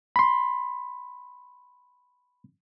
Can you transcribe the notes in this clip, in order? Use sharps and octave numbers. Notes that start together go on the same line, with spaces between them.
B5 C6